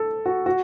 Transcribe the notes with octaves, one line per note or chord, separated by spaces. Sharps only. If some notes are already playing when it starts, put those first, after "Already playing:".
Already playing: A4
F#4
F#4